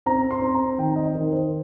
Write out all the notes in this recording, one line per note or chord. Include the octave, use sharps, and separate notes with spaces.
C4 A#5
C6
C4
A#5
D#3 G5
D#5
D#3 A#4
C5